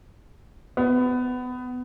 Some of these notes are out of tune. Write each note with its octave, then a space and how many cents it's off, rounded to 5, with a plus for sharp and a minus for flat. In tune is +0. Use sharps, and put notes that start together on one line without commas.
B3 +20